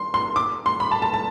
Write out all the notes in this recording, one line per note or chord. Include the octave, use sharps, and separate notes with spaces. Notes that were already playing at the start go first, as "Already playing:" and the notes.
Already playing: C6
C6
D6
C6
B5
A5
A5
A5